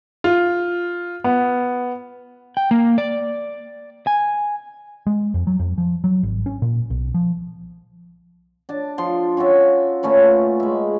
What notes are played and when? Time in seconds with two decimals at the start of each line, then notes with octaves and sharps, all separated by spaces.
0.24 F4
1.24 B3
2.57 G5
2.71 A#3
2.98 D5
4.07 G#5
5.07 G#3
5.34 F2
5.47 F#3
5.59 F2
5.78 F3
6.04 F#3
6.23 G#1
6.46 C#4
6.62 A#2
6.90 B1
7.14 F3
8.69 D4 A5
8.98 F3 C6
9.37 C#4 F4 F#4 E5
10.03 A#2 A3 C#4 B4
10.60 G#3 E5